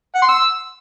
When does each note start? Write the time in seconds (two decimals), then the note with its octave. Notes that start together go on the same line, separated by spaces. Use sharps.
0.15 F#5
0.22 C6
0.29 E6